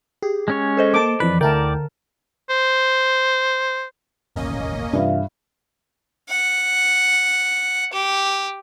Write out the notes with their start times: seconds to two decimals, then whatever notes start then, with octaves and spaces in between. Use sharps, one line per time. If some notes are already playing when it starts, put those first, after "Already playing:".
0.22 G4 G#4
0.48 G#3 C#4 C#5
0.77 A4 C5 D#5
0.94 A#3 A5 D6
1.20 F2 E3 B4 D5
1.41 D2 D3 E4 A#4 D5 G5 A5
2.50 C5
4.36 E1 A1 D#2 A#3 C#4 D#5
4.93 G2 C3 E3 F4 E5 F5
6.29 F#5
7.93 G4